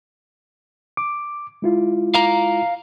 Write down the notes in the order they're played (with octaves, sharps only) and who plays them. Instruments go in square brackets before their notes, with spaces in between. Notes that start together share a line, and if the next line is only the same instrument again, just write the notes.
[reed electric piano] D6
G#3 E4 F4
[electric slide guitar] F5 A#5